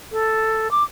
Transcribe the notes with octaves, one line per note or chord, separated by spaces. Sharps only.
A4
D6